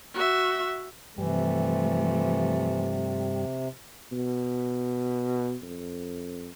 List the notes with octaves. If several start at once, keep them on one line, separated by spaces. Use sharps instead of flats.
F#4 E5
G2 C3 E3 F3 G3 A3
B2
F2